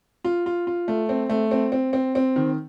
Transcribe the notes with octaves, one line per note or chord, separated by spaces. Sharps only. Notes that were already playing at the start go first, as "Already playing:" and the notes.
F4
F4
F4
A3
C4
A3
C4
C4
C4
C4
D#3